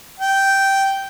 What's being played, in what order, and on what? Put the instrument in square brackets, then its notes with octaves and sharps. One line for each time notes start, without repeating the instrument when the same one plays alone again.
[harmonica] G5